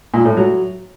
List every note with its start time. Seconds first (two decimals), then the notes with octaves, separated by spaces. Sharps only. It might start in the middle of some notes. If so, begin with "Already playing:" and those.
0.14 A#2
0.25 A2
0.37 F#3